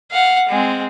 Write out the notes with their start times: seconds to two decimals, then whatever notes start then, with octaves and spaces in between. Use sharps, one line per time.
0.12 F5 F#5
0.49 G#3 C4